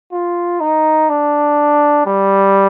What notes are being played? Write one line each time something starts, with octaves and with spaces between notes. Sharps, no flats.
F4
D#4
D4
G3